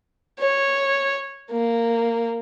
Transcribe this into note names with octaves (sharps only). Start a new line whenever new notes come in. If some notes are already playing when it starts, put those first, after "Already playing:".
C#5
A#3